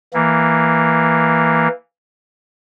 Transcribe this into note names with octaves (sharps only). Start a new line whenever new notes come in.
E3 A#3